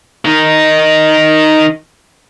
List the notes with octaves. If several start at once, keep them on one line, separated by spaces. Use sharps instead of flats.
D#3 D#4